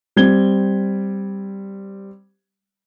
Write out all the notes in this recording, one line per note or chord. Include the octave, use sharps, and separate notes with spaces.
G3 C4 G#6 G7